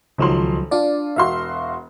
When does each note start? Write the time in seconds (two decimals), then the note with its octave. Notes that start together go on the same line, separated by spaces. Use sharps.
0.18 D#1 C#2 F3 F#3 D#4 C6
0.71 D4 F4 D5
1.16 E1 F#4 E5 F5 C6